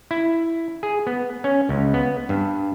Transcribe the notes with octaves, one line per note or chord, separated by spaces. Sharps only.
E4
G#4
B3
C#4
C#2
B3
G2